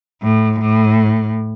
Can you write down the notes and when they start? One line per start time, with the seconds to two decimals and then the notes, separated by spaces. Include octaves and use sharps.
0.23 A2
0.60 A2